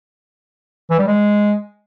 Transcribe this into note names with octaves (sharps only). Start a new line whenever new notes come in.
E3
G3
G#3